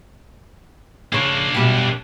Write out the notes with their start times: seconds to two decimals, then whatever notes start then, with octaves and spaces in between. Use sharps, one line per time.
1.12 C#3 A#3 D4 C#5
1.55 F#2 B2 G3